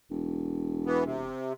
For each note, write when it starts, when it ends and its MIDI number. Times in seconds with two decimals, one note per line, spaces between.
0.10 1.33 28
0.86 1.04 52
0.86 1.04 59
1.05 1.53 48